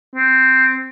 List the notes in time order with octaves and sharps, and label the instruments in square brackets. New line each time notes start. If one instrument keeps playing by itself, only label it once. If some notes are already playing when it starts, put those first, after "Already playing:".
[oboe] C4